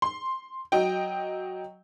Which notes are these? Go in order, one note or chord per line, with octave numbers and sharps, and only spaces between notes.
C6
F#3 D#5 G5